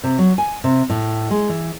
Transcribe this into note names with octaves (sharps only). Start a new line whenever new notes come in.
C3
F#3
G#5
C3
A2
G#3
E3